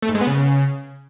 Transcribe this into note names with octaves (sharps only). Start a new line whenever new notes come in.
A3
G#2
G#3
B3
C#3